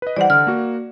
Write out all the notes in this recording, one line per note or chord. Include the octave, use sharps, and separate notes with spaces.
B4 D#5
E3 G3 C5 D5 F#5
D3 F6
A#3 F#4